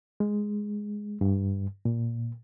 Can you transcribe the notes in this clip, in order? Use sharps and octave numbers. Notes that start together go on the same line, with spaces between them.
G#3
G2
A#2